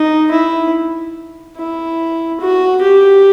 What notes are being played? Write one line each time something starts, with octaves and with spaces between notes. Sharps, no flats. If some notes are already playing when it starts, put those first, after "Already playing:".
Already playing: D#4
E4
E4
F#4
G4